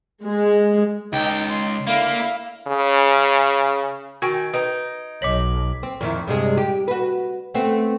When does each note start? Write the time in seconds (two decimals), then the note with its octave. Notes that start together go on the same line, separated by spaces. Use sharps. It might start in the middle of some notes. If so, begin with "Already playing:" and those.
0.23 G#3
1.13 C#2 D#4 G5
1.49 C6
1.87 D3 A#3 E4 F5
2.68 C#3
4.22 D#3 F#4 G#5 C#6 G#6 D7
4.54 D#4 B4 D7
5.22 B1 C#5 D#5 D6 B6 F#7
5.83 C4
6.01 F2 D#3 E4
6.27 G2 C3 G#3
6.57 G4
6.88 F#4 B4
7.54 A3 B3 C4